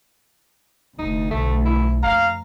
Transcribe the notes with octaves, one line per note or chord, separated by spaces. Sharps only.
F1 D2 D#4
B1 A3
E4
F2 F5 A#5